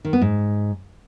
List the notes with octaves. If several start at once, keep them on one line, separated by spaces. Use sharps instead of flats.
D#3
B3
G#2